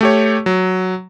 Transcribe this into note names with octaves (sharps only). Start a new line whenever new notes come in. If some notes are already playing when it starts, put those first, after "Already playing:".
A3 G4 C#5
F#3